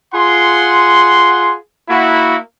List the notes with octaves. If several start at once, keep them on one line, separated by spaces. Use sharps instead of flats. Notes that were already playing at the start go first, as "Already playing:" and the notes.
F4 G#4 F#5 C6
A#3 E4 F#4